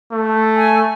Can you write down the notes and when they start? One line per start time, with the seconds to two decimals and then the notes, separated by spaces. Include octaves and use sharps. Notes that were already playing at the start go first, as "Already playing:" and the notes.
0.12 A3
0.56 G#5